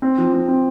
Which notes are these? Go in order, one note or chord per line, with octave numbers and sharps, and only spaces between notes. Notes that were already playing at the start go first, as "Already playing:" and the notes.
C4
F3
C4
C4